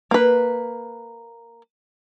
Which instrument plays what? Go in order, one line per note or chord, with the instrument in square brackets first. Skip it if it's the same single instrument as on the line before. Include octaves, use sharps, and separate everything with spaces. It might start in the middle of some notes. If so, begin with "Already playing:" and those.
[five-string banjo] A#3 B4